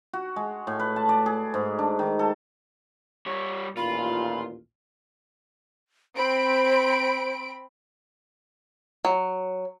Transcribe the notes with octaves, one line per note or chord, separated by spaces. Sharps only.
F#4
G#3
A2
B4
A5
D5
G#4
G#2
D4
D#3
A4
G3 C#5
A1 D#2 A#2 F4 B5
C4 C5 B5 D7
F#3